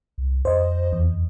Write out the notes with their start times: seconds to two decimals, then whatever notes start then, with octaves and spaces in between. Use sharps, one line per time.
0.18 C2
0.45 F2 C5 D#5
0.93 E2